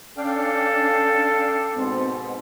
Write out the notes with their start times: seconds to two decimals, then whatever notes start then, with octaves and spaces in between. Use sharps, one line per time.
0.17 C#4 D4 A4 F5 G5
1.75 G#2 B2 C4